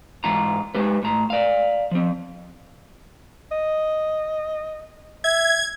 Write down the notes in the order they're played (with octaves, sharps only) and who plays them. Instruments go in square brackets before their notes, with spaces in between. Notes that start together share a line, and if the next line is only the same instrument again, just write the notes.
[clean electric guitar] G#2 E3 F4 A#5
G#3 G4 B4
A2 A#5
D5 F5
F3 C4
[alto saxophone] D#5
[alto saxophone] E5 [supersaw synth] G#6